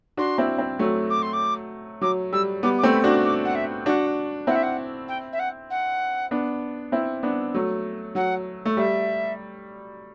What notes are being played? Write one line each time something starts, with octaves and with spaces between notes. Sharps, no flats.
D4 F#4 C6
C4 E4
C4 E4
F#3 A3
D6
C6
D6
F#3 D6
G3 E6
G3 B3 D6
D6
A3 C4
B5
D4 F#4
D6
D6
F#5
E5
D4 F#4 F#5
C4 E4 F#5
E5
F#5
G5
E5
F#5
F#5
B3 D4
C4 E4
B3 D4
F#3 A3
F#3 F#5
A3
G3 E5